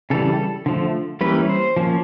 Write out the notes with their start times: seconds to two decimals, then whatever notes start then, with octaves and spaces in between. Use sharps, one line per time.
0.10 C#3 E3 G3 A4
0.66 D3 F3 A3
1.21 E3 G3 A#3 C#4 B4
1.49 C5
1.77 F3 A#3 C#4